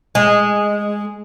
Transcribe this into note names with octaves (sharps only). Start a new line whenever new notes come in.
G#3